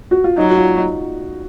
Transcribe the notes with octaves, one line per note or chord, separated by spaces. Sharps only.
F#4
F4
F#3 D#4
F#4
F4
D#4